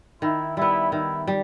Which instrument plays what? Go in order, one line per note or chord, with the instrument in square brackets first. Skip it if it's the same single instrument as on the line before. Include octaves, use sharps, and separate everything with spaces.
[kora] D#3 [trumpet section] E4
[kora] G3 B3 [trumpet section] E4
[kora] D#3 [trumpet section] E4
[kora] G3